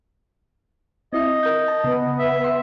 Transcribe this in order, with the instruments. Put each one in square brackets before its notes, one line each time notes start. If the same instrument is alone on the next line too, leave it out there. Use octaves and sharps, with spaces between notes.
[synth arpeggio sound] C4 E4 E5 [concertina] D#5
[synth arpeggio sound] A#4 G6
A5
[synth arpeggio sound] C#3 [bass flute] B3
[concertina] E5
[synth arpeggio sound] E5 C6